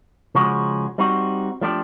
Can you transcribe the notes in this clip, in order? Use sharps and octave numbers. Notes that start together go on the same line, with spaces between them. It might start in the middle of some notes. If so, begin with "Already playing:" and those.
C#3 F3 G#3 C#4 F#4
G3 C4 D#4 F#4
F3 A3 D4 G4